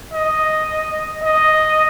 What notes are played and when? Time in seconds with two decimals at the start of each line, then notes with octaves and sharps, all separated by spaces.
0.14 D#5
1.24 D#5